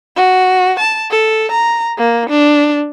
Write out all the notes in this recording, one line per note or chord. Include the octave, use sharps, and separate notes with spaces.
F#4
A5
A4
A#5
A#3
D4